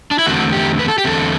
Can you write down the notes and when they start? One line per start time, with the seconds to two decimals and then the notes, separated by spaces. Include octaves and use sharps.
0.11 D4
0.19 E4
0.26 E2 D3 A3 C4 F#4
0.52 G4
0.79 B4
0.88 A4
0.98 G4
1.04 E2 D3 A3 C4 A4